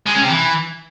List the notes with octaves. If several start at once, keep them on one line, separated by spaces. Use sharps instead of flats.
G#3
C#4
C3
E3